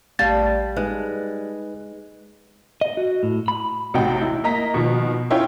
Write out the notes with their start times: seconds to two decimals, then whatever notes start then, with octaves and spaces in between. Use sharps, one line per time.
0.19 A1 G3 A3 F5 A5 A6
0.76 G#3 D#4 B4 F#6
2.81 D#5
2.97 F#4
3.23 A2
3.48 B5
3.94 A1 C3 D#4 F#4 G5
4.21 E4
4.44 A#3 D#5 A#5 B6
4.74 B2 D#3 F3
5.30 C#4 E4 F4 C#5 G5